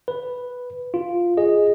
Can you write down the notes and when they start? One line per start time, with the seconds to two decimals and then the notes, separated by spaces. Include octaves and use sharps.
0.08 B4
0.94 F4
1.37 G#4 D#5